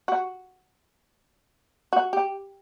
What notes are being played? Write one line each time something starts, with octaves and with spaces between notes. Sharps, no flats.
F#4
F#4
G4